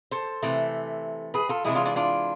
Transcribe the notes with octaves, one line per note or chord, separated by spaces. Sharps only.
A4 C5
C3 E3 A3
G#4 B4
F4 A4
C3 E3 G#3 E4 G#4
D4 F4
D4 F4
D4 F4